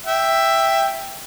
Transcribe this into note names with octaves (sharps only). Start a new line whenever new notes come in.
E5 G5